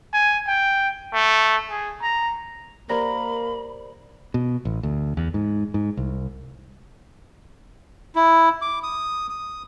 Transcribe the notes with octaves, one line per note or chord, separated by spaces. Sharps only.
G#5
G5
A3
G#4
A#5
A#3 G4 A#4 C5 D5 A#5 B5
B2
A1
D2
E2
G#2
G#2
C2
E4
D6
D#6
D#6